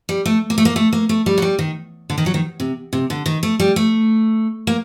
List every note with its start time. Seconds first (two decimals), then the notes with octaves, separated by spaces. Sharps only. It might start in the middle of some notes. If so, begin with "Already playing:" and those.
0.09 G3
0.26 A3
0.50 A#3
0.58 A3
0.65 A#3
0.76 A3
0.93 A#3
1.09 A3
1.26 G3
1.38 F#3
1.42 G3
1.59 D#3
2.10 D3
2.18 D#3
2.26 F#3
2.34 D#3
2.60 C3
2.93 C3
3.10 D3
3.26 D#3
3.43 A3
3.60 G3
3.76 A3
4.67 A#3